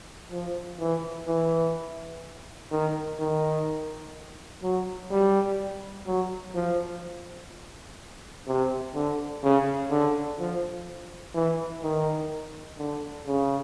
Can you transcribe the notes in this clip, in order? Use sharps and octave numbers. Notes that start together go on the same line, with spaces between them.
F3
E3
E3
D#3
D#3
F#3
G3
F#3
F3
C3
D3
C#3
D3
F3
E3
D#3
D3
C#3